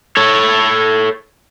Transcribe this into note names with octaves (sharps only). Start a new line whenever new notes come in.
A4 C#5